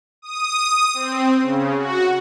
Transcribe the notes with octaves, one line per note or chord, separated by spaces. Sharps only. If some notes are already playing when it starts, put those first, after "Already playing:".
D#6
C4
C#3
F#4